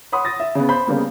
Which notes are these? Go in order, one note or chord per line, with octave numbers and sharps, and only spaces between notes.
C#5 F#5 B5 C6 D#6
D#6 A6 A#6
E5
C#3 B3
C5 B5 G6
C#3 G3 A#3 B3